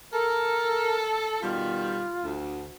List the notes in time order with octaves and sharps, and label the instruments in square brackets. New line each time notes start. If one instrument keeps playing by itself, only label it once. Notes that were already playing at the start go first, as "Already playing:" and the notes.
[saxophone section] A4 [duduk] A#4
[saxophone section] B2 D#3 G3 [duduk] F4
[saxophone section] D2